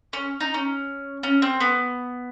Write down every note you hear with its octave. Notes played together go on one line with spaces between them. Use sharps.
C#4
D#4
C#4
C#4
C4
B3